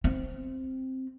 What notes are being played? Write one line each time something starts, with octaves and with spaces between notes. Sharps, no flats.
C4